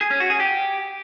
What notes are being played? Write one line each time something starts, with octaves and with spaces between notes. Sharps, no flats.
G#4
C#4
F#4
G#4
G4